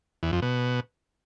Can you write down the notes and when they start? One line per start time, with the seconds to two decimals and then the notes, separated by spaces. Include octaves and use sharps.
0.23 E2
0.32 F2
0.42 B2